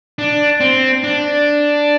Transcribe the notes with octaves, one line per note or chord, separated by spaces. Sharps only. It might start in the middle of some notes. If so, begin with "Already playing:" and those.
D4
C4
D4